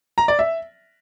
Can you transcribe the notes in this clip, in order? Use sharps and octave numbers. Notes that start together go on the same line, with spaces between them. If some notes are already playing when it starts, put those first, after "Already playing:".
A#5
D5
E5